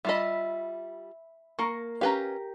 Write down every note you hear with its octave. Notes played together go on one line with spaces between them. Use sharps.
G3 F4 D#5 E5 B5
A#3 A#4 C#6
C#4 G4 B4 F5 G5 A#5